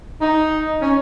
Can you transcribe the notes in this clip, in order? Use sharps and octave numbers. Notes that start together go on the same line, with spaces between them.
D#4
C#4